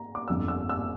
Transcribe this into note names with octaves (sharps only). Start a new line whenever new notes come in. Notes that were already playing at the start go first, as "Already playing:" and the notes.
Already playing: A#5
D6
G1 F2 D3 E6
E6
E6